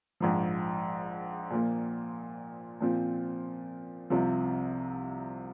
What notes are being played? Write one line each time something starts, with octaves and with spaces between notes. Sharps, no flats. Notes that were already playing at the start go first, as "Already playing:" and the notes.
A#1 G#2 F3
A#2 F3 A#3
A#2 F3 C4
C2 C3 F3